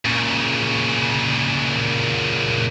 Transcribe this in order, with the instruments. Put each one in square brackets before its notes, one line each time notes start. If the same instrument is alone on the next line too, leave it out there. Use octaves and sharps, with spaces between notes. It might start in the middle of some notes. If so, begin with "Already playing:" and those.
[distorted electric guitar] A#2 C#3